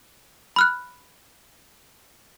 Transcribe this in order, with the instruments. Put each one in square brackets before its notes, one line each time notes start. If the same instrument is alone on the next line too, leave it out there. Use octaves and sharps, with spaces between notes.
[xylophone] B5 F6 F#6